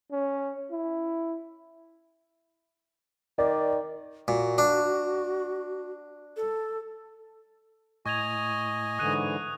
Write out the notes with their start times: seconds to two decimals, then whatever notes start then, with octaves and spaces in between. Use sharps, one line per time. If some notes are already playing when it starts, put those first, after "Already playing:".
0.12 C#4
0.71 E4
3.38 D#3 D5
4.28 A#2 F#4
4.58 D4
6.37 A4
8.06 A2 D#5 G#5 C#6 G#6 F7
8.99 G#2 D3 E3 D#6 F#6 D#7